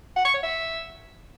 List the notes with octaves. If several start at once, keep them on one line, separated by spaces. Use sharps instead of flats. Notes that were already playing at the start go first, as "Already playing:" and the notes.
F#5
C#6
C#5
E5